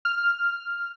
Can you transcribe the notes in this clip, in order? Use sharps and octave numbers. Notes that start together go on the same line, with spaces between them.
F6